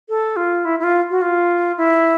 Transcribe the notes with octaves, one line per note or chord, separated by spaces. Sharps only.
A4
F4
E4
E4
F4
F#4
F4
E4